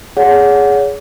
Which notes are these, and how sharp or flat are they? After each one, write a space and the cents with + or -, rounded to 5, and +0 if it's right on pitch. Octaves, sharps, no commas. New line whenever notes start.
G#4 +0 C#5 +30 F#5 -15